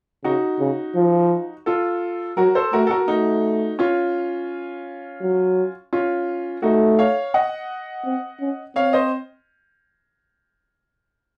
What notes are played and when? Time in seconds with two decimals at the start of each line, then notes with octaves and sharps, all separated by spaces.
0.24 C#3 D#4 F#4
0.60 C#3
0.95 F3
1.66 F4 A4
2.37 F#3 F#4 A#4
2.55 A4 C5
2.73 A3 F#4 A#4
2.87 A4
2.91 F#4 A#4
3.08 A3 D#4 F#4
3.79 C#4 F4
5.21 F#3
5.93 C#4 F4
6.62 A3 D#4 F#4
6.99 C#5 F5
7.34 D#5 F#5
8.05 C4
8.40 C#4
8.76 C4 C#5 F5
8.93 C5 D#5